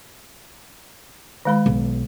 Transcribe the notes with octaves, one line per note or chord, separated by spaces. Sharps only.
D#3 G#3 B5
B1